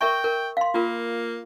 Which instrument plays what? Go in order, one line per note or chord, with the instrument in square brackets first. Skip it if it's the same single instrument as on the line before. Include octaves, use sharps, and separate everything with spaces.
[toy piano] A#4 E5 C#6 [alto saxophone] G5
[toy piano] A#4
F5 C6
[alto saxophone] A#3 [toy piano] F4 A#4